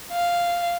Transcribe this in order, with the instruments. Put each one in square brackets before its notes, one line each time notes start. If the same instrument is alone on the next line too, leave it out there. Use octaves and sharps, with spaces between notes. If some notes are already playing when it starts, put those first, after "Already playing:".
[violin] F5